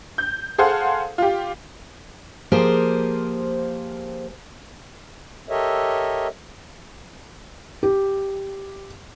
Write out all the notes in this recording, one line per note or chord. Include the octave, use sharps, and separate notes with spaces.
G6
G#4 A4 C5 F5 F#5
F4 G4
F3 A#3 G4 G#4 A#4 C5
G4 A4 A#4 C#5 D#5 E5
G4